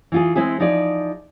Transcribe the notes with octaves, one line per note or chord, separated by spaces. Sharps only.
E3 F4 G#4
G#3 C4 E4 G#4
F3 D#4 G#4 D5